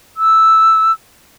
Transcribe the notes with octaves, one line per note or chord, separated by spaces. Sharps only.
E6